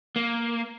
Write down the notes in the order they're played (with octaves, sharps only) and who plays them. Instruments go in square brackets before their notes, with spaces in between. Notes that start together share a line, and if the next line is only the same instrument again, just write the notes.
[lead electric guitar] A#3